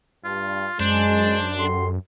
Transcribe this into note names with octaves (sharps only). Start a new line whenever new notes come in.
G2 F4
F#2 G#3 D4 C5
F#4 G4 A4 C6